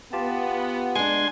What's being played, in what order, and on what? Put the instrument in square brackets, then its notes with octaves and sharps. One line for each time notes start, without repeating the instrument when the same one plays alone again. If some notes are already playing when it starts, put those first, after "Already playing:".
[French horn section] B3 [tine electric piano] F4 G4 A5
[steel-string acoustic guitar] G#3 D4 [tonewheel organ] G#5 C6 G#6